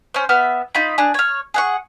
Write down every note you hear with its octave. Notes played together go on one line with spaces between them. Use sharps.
C#4 C5
B3 E5 F6
D#4 F4 B5
D4 G#4
C#5 F6
G#4 F#5 C#6